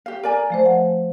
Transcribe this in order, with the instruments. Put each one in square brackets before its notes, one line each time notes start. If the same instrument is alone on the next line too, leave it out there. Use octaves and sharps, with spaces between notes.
[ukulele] G4 F5
A#4 D5 G#5
[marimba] F3 A3 C5
F#5